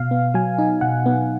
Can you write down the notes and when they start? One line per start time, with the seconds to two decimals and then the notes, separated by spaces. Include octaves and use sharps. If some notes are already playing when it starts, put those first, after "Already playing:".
Already playing: B2 F5
0.11 B3
0.34 F#3 G#5
0.59 D#4
0.81 B2 F#5
1.06 B3